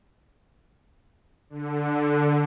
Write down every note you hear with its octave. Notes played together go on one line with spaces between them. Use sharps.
D3